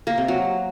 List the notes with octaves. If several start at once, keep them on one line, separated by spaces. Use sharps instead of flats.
A#3
C3
F#3